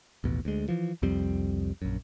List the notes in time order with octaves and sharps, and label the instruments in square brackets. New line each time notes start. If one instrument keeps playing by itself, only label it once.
[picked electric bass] A1 D#2 B2
D2 G#3
E3 F3
C2 F2 G3 C4
A#1 F#2